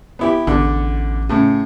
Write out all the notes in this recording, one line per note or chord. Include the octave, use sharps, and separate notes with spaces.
B3 E4 G4
A1 E2 D3
A2 C#3